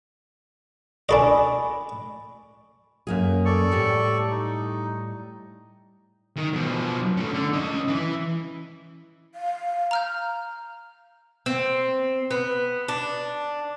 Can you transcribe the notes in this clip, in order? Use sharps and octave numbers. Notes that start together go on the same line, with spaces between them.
D4 A4 D#5 G#5 B5 C#6
F#2 A#3 G#4
A4 D5 C#6
A2 G3
D#4
D#3 A#4
B2 F3
A3 C#4
D3
C#4 D#5
E3 B4
F5
A#5 F6 G6
C4
B3
D4